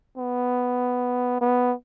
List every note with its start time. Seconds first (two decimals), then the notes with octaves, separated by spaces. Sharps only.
0.18 B3
1.41 B3